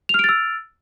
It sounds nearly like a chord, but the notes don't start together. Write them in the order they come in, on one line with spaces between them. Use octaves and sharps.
F7 F6 D7 A6 E6